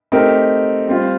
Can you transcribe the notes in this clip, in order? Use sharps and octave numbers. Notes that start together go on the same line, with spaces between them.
A3 C4 D#4 G4 A#4
G3 C4 F4